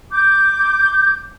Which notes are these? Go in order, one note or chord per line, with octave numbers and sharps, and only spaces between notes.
D6 G6